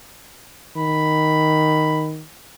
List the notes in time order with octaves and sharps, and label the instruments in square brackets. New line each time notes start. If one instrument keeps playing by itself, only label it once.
[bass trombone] D#3 [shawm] B5